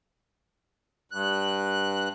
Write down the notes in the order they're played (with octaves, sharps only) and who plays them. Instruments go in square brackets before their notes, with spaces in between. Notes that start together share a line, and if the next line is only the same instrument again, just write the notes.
[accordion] G2 F#6